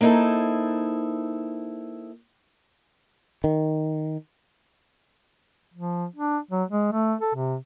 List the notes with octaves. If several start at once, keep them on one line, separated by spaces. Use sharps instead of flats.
A#3 C4 D#4 E4 A4
D#3
F3
D4
F#3
G#3
A3
A4
C3